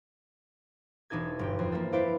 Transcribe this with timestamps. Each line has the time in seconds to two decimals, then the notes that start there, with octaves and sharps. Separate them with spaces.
1.10 E1 D4 D#4 A4 G#6
1.39 G1 G2 G5
1.59 F2
1.72 A#3 E4 F4 A4
1.92 E4 A4 B4 C5 D5 F5